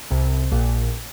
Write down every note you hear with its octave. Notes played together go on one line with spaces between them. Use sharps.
C2 C3
A#1 A#2